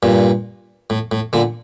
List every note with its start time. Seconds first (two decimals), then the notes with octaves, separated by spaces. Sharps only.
0.03 G2 A#2
0.90 A2
1.12 A2
1.33 A#2 D3